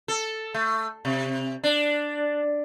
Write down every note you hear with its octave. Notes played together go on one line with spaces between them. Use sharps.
A4
A3
C3
D4